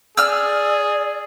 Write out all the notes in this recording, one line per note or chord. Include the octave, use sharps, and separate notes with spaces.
G#4 D5 E6 F6